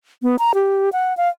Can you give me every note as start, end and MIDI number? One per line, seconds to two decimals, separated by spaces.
0.23 0.36 59
0.39 0.52 82
0.55 0.89 67
0.93 1.16 78
1.17 1.29 77